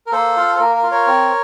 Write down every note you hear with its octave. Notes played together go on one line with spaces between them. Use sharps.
A#4
A#3 A4 C5
F4
A4
A#3 A#4
A#4
F4
A#4 C#5
C4